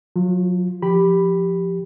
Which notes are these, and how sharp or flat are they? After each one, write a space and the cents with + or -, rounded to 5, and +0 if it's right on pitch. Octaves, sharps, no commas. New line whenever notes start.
F#3 -35 F4 +0
F3 +0 G4 +0 B5 +0